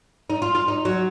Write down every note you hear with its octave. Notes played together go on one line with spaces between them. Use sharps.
D#4
F4
F4
D#4
F#3